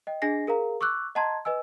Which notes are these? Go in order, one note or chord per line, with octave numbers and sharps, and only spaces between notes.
D#5 G5
D4 G#4 D#5 G#5 A#6 C7
G#4 A#4 F5 A#5
C#6 D6 E6 F#6
D#5 F#5 A5 A#5 C6 G#6
B4 D#5 G#5 E6